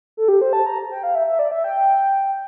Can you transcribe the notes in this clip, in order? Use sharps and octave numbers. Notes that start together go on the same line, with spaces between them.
A4
G4
C5
A5
A#5
G5
F5
E5
E5
D5
E5
G5